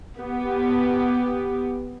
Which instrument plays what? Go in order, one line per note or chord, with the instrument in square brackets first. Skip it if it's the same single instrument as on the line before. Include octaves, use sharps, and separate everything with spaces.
[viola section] B3 G4